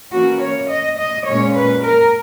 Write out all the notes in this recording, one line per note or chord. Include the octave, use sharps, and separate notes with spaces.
E3 A#3 C#4 F#4
C#5
D#5
D#5
A#2 G#3 C#4 C#5
B4
A#4